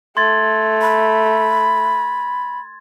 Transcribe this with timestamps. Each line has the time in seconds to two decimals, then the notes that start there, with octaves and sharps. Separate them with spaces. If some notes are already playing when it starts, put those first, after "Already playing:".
0.17 A3 C6 G#6 A6
0.81 B5